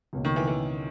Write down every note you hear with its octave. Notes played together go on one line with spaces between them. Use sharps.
C#2 B2 A#3 C#4
D#3
E3
E3